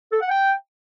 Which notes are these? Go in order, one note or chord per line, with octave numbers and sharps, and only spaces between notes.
A4
F#5
G5